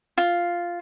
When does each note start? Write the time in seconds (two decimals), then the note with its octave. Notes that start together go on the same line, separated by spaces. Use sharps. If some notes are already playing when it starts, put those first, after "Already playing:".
0.18 F4